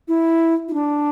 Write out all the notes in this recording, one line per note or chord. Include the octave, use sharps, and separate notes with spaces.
E4
E4
D4